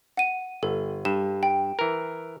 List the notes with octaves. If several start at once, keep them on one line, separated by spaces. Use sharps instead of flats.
F#5 D#7
G1 A4
G2 E7
G5
E3 A#4